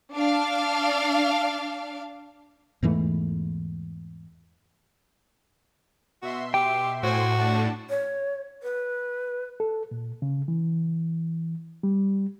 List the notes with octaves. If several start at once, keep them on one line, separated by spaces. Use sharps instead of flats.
D4 F5
E2 G#2 E3 A3
B2 F#4 E5 C6
G4 G5
A2 F#4 C5 G#5 C6
D4 F#5 A5
C#5
B4
A4
A#2
C#3
E3
G3